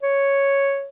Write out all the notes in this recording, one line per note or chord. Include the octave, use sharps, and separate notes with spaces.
C#5